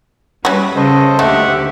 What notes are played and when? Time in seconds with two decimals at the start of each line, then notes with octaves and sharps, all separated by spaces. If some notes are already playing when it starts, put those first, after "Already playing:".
0.45 G3 C#4 F#4 B4
0.76 C#3 A4 C5 D#5
1.19 D2 D#3 A3 G4 E5 F#5